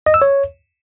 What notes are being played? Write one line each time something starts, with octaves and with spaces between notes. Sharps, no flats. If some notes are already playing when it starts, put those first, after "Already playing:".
D#5
E6
C#5